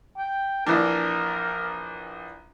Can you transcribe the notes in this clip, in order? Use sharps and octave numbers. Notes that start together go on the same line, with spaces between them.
G5
A#1 E3 D4 A#4